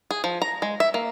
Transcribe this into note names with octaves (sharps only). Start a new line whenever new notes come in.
G#4
F3
A#5
G#3
E5
A#3